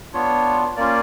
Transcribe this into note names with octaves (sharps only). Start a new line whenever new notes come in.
B3 D4 F4 C#5
A#3 C#4 F4 D5